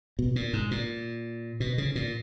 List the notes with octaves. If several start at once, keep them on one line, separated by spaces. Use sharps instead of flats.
B2
A#2
G#2
A#2
B2
C#3
A#2